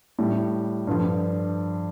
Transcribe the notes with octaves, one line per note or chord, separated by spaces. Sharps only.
A2 G3
G2 D3 F3